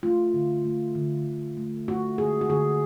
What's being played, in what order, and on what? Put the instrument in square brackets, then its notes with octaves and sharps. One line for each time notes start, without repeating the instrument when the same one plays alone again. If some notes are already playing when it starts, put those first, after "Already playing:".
[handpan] A3 F4
D3
A3
D3
D3
A3
A3 F#4
D3 G#4
F#4
D3 G#4